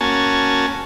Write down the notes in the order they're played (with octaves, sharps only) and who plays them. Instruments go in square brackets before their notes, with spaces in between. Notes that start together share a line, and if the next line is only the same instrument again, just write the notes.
[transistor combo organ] A#3 C#4 F#4 G#5 A5